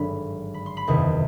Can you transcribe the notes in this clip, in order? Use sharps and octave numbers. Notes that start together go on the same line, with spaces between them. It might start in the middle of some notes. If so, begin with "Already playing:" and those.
Already playing: G#1 G2 D3 F#3 B5
B5
C6
B5
F#1 E2 C3 D#3